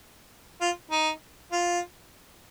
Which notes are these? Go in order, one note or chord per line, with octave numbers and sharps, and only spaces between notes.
F4
D#4
F4